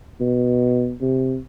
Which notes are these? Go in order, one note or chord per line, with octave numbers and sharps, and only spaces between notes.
B2
C3